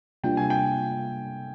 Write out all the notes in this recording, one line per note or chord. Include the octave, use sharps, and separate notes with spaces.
C3 G3 A#3 D4 F4 G5
G#5
G5